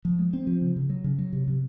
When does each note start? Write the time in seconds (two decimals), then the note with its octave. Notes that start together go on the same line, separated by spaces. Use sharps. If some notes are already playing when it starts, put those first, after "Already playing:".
0.05 F3
0.19 G#3
0.33 C4
0.47 F3
0.61 C#3
0.76 C#3
0.90 F#3
1.04 C#3
1.19 F#3
1.33 C3
1.48 C3